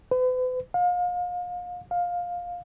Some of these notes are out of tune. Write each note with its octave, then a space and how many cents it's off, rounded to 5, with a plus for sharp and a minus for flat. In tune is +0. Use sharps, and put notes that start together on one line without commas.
B4 +45
F5 +35
F5 +15